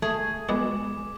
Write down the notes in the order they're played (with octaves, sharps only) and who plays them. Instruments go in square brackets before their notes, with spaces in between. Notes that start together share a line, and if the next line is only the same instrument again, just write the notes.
[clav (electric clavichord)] A3 [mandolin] G#4
[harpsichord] G#3 B3 F#4 [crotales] D6